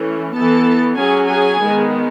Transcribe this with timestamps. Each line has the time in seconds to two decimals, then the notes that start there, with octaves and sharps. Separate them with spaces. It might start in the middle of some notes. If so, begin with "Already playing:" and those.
Already playing: E3 A3 C#4
0.34 E3 B3 A4 A5
0.97 F#3 C#4 G#4 G#5
1.28 G#4 G#5
1.60 D#3 G#3 B3